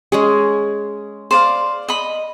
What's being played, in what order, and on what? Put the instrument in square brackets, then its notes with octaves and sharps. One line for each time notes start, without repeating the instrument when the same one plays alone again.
[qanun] G#3 C#4 G#4
[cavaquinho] C5 D5 F5
D#5 B5